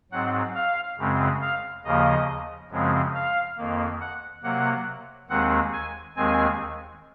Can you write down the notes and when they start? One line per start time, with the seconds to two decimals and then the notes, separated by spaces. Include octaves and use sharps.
0.12 G#2 F#3 C4 F#5
0.55 F5
0.98 F#2 C#3 G#3 C4
1.42 F5
1.84 D#2 C#3 F3 A#3 D#5
2.70 F#2 C#3 F3 G#3 C4
3.15 F5
3.58 F2 D#3 A#3
4.01 F#5
4.43 C3 F#3 A#3 F#5
5.30 D#2 D#3 G#3 C4 F#5
5.73 G#5
6.16 D#2 D#3 G#3 C4 G#5